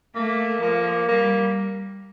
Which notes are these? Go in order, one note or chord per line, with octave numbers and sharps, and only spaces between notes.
A3 A#3
F3 A#3
G3 A#3